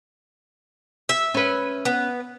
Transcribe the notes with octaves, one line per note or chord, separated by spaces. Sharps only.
E5
C#4 B4
B3